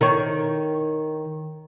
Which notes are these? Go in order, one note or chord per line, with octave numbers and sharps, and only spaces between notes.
D#3 C#5